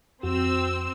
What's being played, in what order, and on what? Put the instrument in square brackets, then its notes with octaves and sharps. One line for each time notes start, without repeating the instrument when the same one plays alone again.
[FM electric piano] F2 F#4 [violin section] C4 E6